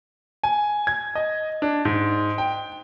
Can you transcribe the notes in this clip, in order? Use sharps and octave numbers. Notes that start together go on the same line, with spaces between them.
G#5
G#6
D#5
D4
G#2
G5